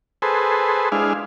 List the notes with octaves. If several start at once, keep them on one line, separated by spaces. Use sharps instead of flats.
G#4 A4 B4 C5
G#3 D4 E4 G#4 F5